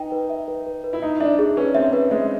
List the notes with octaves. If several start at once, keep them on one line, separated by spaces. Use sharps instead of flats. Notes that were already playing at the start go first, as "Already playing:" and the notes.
Already playing: D#4 B4 G5
B4
E5
B4
B4
B4
E4
D#4 E5
D4 E5
D4 G#4
C#4 B4
C4 E5
B4
G#3 E5